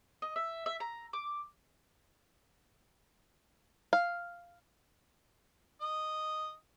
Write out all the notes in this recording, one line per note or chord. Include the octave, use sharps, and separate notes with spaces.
D#5
E5
E5
A#5
D6
F5
D#5